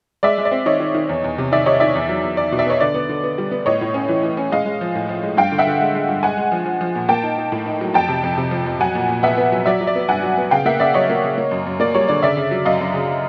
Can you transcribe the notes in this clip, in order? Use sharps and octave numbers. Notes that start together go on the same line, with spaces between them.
G#3 D5 E5
G#3
D5
C4
D#3 C#5 D#5
D#3
D#3
E2
E2
C3
D#3 D5 E5
C3 C#5 D#5
D#3 D5 E5
E2
F#3
E2
E2 D5
B2
D5 E5
B3 C#5 D#5
D3 D5
B3
D3
B3
G3
B3
A2 C#5 D#5
A2
C#4
E3
E3
C#4
G#3 D#5 F5
G#3
F3
A2
F3
G#3
G2 F5 G5
D3
E5 F#5
D3
G#3
G#3
G2
G#3 F#5 G#5
G#3
F3
F3
F3
A#2
A#3 G5 A5
D#4
D#4
A2
D#4
F#3
F2 G5 A5
C3
F2
C3
F3
F2
F#3 F#5 G#5
A#2
A#2
B3 E5 F#5
B3
F#3
F#3 D5 E5
F#3
D5
B3
G2 F#5 G#5
F#3
B3
C#3 F5 G5
A#3 E5 F#5
C#3 D5 E5
F#3 C#5 D#5
A#3
C#3
A#3
F#2
F#2
A#3 D5
G3 C#5
D3 D5
C#3 D5 E5
C#3
F#3
F#2 D#5 F5
F#2
C#3